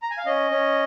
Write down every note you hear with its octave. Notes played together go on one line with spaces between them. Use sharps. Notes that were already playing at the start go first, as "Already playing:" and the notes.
A#5
G#5
F5
C#4 D#5
C#4